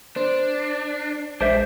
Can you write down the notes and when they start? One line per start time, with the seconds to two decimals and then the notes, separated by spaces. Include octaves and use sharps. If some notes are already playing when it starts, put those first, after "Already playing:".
0.16 D4 C5
1.41 A#1 G#3 D4 C5 E5